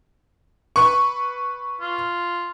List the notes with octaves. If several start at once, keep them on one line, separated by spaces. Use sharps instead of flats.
B4 C#6
F4